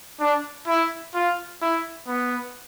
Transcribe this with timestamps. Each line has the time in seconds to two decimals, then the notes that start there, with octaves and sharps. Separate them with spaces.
0.20 D4
0.67 E4
1.14 F4
1.62 E4
2.08 B3